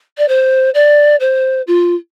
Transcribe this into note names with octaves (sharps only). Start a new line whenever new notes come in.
D5
C5
D5
C5
F4